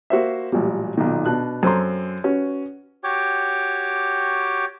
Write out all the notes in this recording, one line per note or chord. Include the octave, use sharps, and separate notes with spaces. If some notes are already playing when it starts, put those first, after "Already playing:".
A#3 F#4 C5 E5
A1 A#2 F#3 G3
B1 A#2 D#3
B2 D4 F#6
F#2 C4 A4 A#5 C6
C#4 F#4 B4
F#4 G4 C#5 G5 D6